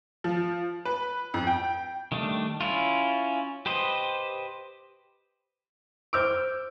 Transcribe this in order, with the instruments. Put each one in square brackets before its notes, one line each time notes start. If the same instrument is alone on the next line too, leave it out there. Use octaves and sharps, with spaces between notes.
[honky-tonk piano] F3
B4
F2
G5
[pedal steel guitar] D#3 G3 A3 D4
C#4 E4 F4
G4 B4 C5 D#5
[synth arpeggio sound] C5 F6 D7 [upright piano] D6 E6 G6